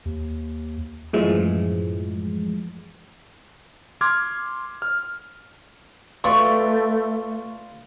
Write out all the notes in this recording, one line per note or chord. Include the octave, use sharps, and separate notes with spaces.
D#2
F#2 A2 E3 F3 G#3
C6 D6 F6 G#6
F6
A3 F4 B4 D5 C#6